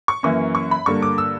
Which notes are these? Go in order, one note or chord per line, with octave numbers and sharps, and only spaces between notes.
C#6
F#2 E3 A#3 C#4 C#6
C#6
B5
G2 D3 A#3 C#6
D6
E6